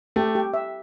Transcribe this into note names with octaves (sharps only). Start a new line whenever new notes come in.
A3 G4
G4
E5